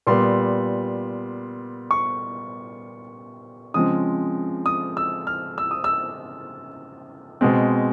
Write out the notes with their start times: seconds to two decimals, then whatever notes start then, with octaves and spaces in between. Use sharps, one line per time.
0.07 A#2 G3 B3 C6
1.91 C#6
3.74 C#3 F3 G#3 C4 D#6
4.66 D#6
4.97 E6
5.27 F6
5.58 E6
5.71 D#6
5.84 E6
7.41 B2 G#3 C4